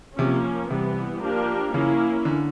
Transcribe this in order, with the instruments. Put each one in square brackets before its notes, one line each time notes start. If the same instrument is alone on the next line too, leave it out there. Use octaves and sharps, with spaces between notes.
[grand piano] C3 [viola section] F3 A#3 C#4
[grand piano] C3 [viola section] E3 G3 B3
[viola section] F3 A#3 D4 G4 A#4
[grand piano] C#3 [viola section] A#3 C#4 E4
[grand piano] D3